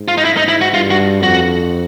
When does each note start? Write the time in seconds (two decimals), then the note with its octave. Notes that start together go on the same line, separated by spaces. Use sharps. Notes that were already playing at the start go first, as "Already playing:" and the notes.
Already playing: G#2
0.08 F4
0.18 D#4
0.25 E4
0.37 D#4
0.48 E4
0.61 F#4
0.74 G2 F4
0.91 F#4
1.23 F2 F#4